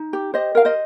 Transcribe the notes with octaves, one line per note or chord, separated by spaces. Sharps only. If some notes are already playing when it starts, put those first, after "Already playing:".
Already playing: D#4
G4
G4 C5 D#5
A#4 F5
C5 D#5